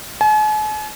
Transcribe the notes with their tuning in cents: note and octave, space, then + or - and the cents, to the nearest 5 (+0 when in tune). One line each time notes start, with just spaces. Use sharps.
G#5 +45